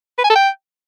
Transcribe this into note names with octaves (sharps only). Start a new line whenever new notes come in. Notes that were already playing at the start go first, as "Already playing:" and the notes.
B4
G#5
A4
G5